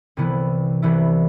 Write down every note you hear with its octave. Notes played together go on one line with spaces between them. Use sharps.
C2 C3 E3 B3 E4
C2 C3 E3 B3 E4